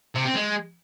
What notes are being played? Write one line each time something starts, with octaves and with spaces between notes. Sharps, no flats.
C3
C4
G#3